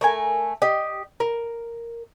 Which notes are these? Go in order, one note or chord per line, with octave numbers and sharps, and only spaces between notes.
A3 A#4 G#5
G4 D#5
A#4